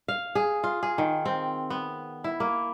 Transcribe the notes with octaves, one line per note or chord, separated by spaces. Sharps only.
F5
G#4
F4
G#4
D#3
C4
B3
E4
A#3